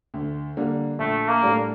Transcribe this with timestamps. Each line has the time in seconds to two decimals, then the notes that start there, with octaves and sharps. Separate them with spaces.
0.14 D2
0.57 D3 G3 A#3
0.99 A#1 A3
1.28 A#3
1.43 A2 G3 D4 A4